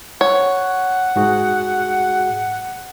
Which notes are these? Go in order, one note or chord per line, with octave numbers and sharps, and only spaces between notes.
C#5 F#5
G#2 F#4 G#4